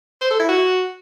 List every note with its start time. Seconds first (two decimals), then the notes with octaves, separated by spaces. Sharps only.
0.21 C5
0.30 A4
0.40 E4
0.49 F#4